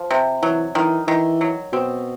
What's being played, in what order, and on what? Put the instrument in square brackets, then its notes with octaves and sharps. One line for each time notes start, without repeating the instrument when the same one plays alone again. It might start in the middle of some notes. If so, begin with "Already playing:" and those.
Already playing: [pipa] F3
C3
[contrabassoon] E3 [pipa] F#3
[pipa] D#3 [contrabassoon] E3
[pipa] D#3 [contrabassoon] E3
[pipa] F#3
[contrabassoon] B2 [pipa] C4